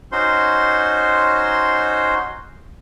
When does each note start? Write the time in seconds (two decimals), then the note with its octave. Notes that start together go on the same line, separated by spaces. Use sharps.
0.12 C#4 D#4 F#4 C5 C6